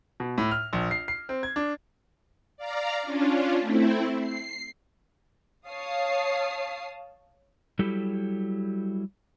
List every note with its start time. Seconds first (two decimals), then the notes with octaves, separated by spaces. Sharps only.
0.20 B2
0.38 A2
0.51 F6
0.73 A#1
0.91 C7
1.08 C7
1.29 C4
1.43 G#6
1.56 D4
2.57 D5 F5 A#5
3.02 C#4 D4 F4
3.60 A3 C4 E4
4.20 C7
5.68 C#5 F5 A5 D#6 C7
7.79 F#3 G3 E4 G4 A4